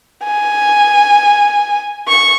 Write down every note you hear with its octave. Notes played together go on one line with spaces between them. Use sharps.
G#5
C#6